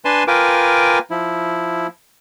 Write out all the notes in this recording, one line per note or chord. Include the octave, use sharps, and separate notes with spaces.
D4 B4 G#5 A5 C6
F4 A#4 B4 G5 G#5 D6
F3 E4